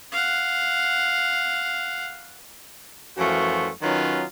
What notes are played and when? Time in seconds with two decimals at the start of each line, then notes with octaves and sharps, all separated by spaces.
0.12 F5 F#5
3.18 F#2 E3 F3 A3 F4 F#4
3.82 D#3 F#3 C#4 D#4 F4 B4